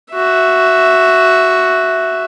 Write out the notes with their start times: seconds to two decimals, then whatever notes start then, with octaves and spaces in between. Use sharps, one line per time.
0.12 F#4 E5